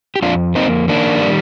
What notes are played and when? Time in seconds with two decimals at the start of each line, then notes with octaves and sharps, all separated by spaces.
0.16 G4
0.22 F2 D4 F4
0.55 A#3 C4 D#4
0.88 D#3 A#3 D4
1.22 G3